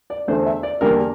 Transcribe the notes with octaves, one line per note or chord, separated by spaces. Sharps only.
D5
E2 D3 A3 D4 C5
E5
D5
E2 D3 G3 A#3 D4 A#4